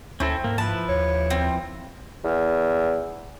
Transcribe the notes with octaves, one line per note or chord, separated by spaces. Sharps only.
D2 C4 C#4 E4 A4
G#2 A#3
F3 E4 B4 A5
D#2 C#5
C4
E2